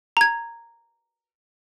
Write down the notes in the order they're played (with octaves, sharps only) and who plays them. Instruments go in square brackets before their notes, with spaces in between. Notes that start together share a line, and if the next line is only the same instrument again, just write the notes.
[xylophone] A#5 G#6